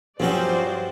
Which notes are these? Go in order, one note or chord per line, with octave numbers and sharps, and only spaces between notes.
G2 F3 F#3 C#4 F#4 C5 D5